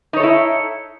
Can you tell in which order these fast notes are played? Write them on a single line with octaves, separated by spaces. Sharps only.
D#4 C#5 A4 E4